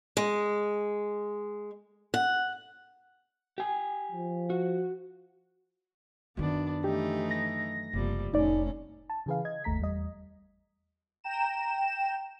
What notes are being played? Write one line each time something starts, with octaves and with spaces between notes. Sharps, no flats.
G#3
F#5
G4 G#5
F3
F#4
F#2 D#3 B3 D4
E3 A3 D#4 G4
A#6
F#1 C3 F3 G3
F1 A2 C#4 D#4 D5
A5
C#3 E3 G#4 B4 F5
D#5 G#6
G1 D#2 A3 A#5 B6
E2 G3 D#5
G5 A#5 E7